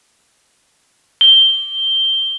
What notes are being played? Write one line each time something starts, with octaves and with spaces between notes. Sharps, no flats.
G7